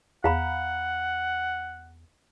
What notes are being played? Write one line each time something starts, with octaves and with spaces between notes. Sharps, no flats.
E2 F5 F#5 A#5 B5